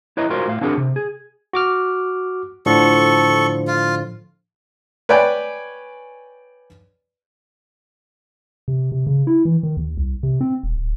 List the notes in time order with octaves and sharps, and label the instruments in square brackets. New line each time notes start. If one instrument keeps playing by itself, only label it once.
[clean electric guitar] E4 B4 C#5 D#5 A#5
F4 F#4 A#4 C5 F5
A2 F5
C4 D4 F#4 G#4 A#4
C3
G#4
[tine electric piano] F#4 D6 F6
[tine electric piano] A2 D3 F3 [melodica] A4 C#6
[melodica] F4
[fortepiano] B4 C#5 D5 G5 G#5
[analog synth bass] C3
C3
C#3
E4
E3
D#3
D#2
C2
C3
C4
D#1
D1